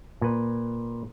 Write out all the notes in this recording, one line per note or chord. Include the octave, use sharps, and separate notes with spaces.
A#2 B4